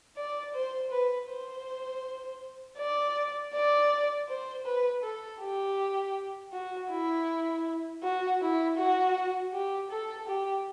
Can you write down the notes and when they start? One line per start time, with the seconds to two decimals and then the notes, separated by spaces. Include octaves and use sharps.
0.17 D5
0.54 C5
0.91 B4
1.28 C5
2.79 D5
3.54 D5
4.29 C5
4.65 B4
5.03 A4
5.41 G4
6.53 F#4
6.91 E4
8.03 F#4
8.41 E4
8.77 F#4
9.53 G4
9.91 A4
10.27 G4